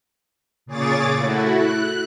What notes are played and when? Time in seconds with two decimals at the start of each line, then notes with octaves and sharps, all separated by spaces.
0.66 A#2 C#3 G#4 C#5 D6 A6
1.17 A3 E4 F#4
1.52 F#6